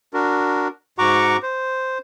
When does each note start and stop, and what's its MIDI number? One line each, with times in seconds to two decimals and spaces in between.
0.14 0.68 62
0.14 0.68 66
0.14 0.68 70
0.98 1.37 44
0.98 1.37 66
0.98 1.37 78
0.98 1.37 82
0.98 1.37 85
0.98 1.37 86
1.43 1.98 72